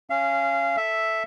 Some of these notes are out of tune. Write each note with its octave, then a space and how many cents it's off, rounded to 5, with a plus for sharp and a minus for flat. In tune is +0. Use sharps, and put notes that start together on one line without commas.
C#4 +0 F5 -25
A4 +0 E5 +0